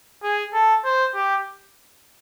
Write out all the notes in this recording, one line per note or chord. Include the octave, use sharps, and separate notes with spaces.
G#4
A4
C5
G4